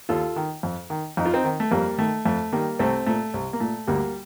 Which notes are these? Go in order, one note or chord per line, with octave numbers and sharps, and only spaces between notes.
D#2 F4 A4
D#3
F2
D#3
F2 D#4
F4
C4 D#4
D#3
A3
F2 G3 A#3
D#3 A3
F2 A3
D#3 G3 A#3
C2 A3 C4
A#2 A3
C2
A#3
A#2 A3
D2 G3 A#3